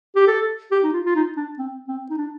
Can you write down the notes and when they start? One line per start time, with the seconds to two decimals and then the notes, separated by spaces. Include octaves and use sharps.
0.16 G4
0.27 A4
0.71 G4
0.84 D#4
0.93 F4
1.05 F4
1.15 D#4
1.37 D4
1.58 C4
1.88 C4
2.10 D#4
2.17 D4